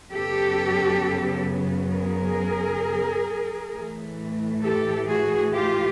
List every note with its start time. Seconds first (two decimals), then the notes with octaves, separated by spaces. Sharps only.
0.13 F#2 C#3 F#3 B3 G4 A4
1.93 G#4 A#4
3.72 A2 E3 A3
4.63 G4 A4
5.08 F#4 G#4
5.52 F4 G4